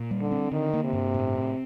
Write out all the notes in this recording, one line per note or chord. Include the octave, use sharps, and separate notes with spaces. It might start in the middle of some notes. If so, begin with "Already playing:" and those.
Already playing: A#2
G3
D3
C4
D3 D#3
A#3
C3
G2
A2
C4